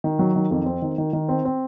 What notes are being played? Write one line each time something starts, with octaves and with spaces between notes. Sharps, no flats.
D#3
F#3
D#3
F2
C4
D#3
D#3
D#3
C4
C4